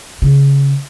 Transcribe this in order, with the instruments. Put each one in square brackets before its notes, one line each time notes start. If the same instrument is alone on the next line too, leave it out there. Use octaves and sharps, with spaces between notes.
[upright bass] C#3